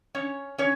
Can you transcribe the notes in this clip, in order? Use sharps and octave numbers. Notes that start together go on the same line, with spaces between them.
C#4 C#5
C#4 C#5